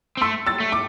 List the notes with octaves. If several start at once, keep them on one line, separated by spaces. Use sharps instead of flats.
C4
A3 C6 E6
E6 A6
A3
D6